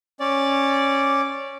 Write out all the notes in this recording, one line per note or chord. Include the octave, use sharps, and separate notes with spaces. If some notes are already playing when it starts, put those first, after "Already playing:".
C#4 D5